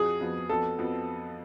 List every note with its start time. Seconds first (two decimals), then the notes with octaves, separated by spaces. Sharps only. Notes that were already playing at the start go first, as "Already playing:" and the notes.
Already playing: F2 F3 F#4 G#4
0.21 F2 F3 B3 F#4
0.49 F2 F3 B3 F#4 A4
0.79 F2 F3 B3 F#4